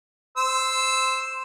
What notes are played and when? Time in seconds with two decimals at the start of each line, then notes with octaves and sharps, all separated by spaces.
0.37 C5 E6